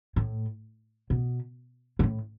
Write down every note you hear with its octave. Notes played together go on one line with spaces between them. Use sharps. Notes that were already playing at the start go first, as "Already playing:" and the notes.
A2
B2
G#2
A2